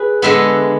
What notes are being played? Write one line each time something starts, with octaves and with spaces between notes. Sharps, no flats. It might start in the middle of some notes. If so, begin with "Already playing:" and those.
Already playing: G#4 B4
D3 G#3 B3 E5 G#5